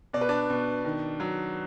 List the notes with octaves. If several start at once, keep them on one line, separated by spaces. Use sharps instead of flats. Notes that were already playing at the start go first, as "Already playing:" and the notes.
B2 D5
B4
D4 D5
B2
D#3
F#3